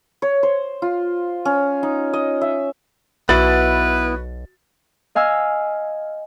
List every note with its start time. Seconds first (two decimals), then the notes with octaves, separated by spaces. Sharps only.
0.22 C#5
0.43 C5
0.82 F4
1.45 C#4
1.83 D#4
2.13 D#5
2.41 E5
3.29 B1 B3 E4 F#4 B4 A6 F#7
5.15 D#5 F5 G#5 E6 F6